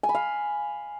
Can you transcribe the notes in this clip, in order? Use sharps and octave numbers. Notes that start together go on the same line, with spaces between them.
G#5
B5
F5